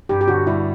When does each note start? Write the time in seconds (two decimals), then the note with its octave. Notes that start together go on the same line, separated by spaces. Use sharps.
0.09 G2 G4
0.21 G4
0.28 D3 F#4
0.47 G3 E4